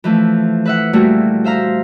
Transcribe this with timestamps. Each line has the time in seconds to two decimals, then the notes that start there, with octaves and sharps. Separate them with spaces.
0.04 E3 F3 A3
0.65 B4 E5 F#5
0.93 A#2 G3 A3 A#3 E4 F#4
1.44 C5 E5 F5 A#5